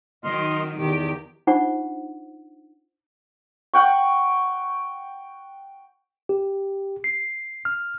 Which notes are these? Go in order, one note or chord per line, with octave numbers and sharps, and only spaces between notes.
D#3 F#3 D#5 C6 F6
E2 D#3 G4
D4 D#4 F4 C5 F#5 C#6
F#5 G5 C#6
G4
C7
F6